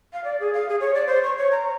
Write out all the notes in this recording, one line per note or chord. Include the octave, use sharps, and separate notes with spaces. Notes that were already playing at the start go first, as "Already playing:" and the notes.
F5
D5
G#4
F5
G#4
C#5
D5
C5
C#6
C#5
A#5